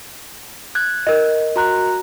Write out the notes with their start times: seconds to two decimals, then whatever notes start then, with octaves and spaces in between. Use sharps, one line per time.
0.75 F#6 G#6
1.07 A#4 D#5
1.56 F#4 A#5 F#6